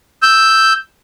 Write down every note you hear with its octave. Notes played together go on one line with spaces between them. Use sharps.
E6 G6